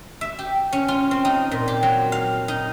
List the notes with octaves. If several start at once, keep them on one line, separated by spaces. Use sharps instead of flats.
E5
G4
C#4
F4
C4
D#4
A#2
G4
F#3
F5
D#4